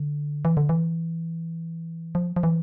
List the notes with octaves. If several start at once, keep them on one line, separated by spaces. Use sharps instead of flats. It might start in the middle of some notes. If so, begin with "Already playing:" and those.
Already playing: D3
E3
D3
E3
F3
F3
E3